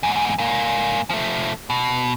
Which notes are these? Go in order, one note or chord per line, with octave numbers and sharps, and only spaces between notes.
E2 G#2
G#2 A#3
F3 A3
B2